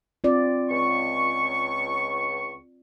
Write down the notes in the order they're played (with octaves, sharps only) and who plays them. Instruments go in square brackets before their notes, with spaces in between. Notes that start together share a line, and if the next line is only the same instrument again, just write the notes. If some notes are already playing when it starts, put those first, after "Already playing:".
[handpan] C4 F4 D5
[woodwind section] C#2 C#6